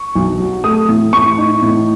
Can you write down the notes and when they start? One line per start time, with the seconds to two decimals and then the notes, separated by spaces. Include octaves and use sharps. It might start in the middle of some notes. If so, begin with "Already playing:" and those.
Already playing: C#6
0.15 B1
0.40 F#3
0.64 A3 D#6
0.89 A2
1.13 A2 C#6
1.38 D#4
1.62 A2